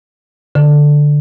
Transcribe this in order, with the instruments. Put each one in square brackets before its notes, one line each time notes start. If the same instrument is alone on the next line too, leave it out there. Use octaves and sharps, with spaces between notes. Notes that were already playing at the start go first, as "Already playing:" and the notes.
[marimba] D3